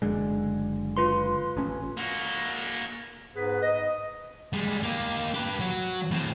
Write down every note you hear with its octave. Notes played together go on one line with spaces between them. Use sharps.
F#1 D3 G#3
F4 B4 C6
A1 C#4
A#3 F#4
G#2 B3 G#4 B4
D#5
G3 G#3
A#3 G4
G4 B4
F#3
A2 C4